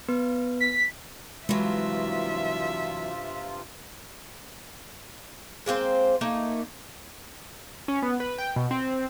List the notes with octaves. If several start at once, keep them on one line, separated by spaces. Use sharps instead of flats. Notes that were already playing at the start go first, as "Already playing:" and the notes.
B3 B4
B6
G2 C3 E3 F#3 G#3 F4 E5
G#3 A#3 C4 C5
A3 A#3 D#4
C#4
B3
B4
G5
B2
C4